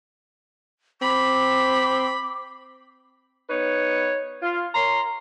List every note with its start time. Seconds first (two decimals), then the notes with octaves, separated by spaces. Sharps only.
1.02 C4 B5 D6
3.49 B3 D#4 B4 C#5
4.42 F4
4.74 A#4 C#5 A#5 C6